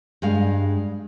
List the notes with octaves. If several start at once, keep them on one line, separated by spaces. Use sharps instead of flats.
G2 G#3 F5